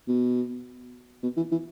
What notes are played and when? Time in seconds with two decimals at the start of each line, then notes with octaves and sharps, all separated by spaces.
0.08 B2
1.23 B2
1.37 E3
1.52 E3